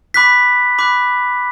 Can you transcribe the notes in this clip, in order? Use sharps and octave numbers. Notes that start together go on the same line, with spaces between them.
B5 D6 F#6 B6
B5 D6 F#6